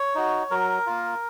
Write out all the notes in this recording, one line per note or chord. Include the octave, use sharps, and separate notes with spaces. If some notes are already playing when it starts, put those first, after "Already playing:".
Already playing: C#5
D#4 F#4
F#3 A#4
A#3 F4